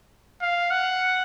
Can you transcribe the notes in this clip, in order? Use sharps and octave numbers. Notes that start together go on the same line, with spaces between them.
F5
F#5